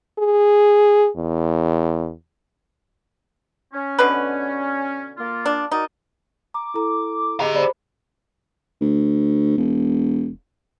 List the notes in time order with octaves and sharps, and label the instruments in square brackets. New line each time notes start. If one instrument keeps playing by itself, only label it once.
[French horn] G#4
E2
[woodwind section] C#4
[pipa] B2 D3 B4
[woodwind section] A#3 F4
[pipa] D4
[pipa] D#4 [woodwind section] F#4 A#4 D5
[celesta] A#5 [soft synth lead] D6
[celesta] E4 A4 A#5
[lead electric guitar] G4 A#5 [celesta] G#4 [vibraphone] D#5
[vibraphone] C5 B5 [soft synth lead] D5
[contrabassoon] D2
E1